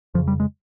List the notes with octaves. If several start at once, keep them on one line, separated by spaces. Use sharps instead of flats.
F2 C#3 F3
G3
G#3